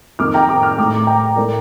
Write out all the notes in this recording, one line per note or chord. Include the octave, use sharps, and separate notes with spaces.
F2 D#3 A#3 D6 F6
G5 A#5
A#5 D6
D6 F6
A2 A3 A#5 D6
G5 A#5
A2 A3 A#4 D5